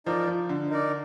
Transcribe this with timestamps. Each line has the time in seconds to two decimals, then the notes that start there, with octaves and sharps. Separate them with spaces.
0.06 F3 D#4 A#4 D5
0.27 F3
0.49 D3
0.70 D#4 A#4 D5